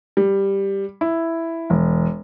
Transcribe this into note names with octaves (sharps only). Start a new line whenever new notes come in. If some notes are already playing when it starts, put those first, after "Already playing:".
G3
E4
E1